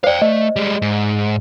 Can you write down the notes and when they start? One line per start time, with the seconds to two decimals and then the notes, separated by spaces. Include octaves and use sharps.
0.04 C5 D5 F5 G5
0.22 A3 D#5
0.56 G3 G#3
0.82 G#2